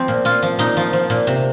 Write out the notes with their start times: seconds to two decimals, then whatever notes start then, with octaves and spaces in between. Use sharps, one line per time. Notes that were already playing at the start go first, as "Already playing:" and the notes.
Already playing: F3 C4
0.08 A#2
0.25 A#2 F4
0.43 F3
0.59 A#2 D#4
0.77 F3
0.93 F3
1.10 A#2
1.27 C3